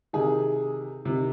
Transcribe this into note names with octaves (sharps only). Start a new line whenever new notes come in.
C3 D#3 G#4
C3 D#3